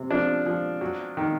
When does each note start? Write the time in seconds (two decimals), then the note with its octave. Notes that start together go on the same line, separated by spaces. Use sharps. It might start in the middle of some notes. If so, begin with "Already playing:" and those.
Already playing: C3
0.11 F3 D4
0.46 F3
0.81 F#3
1.17 D#3